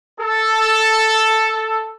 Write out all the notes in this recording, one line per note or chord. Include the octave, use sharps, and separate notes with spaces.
A4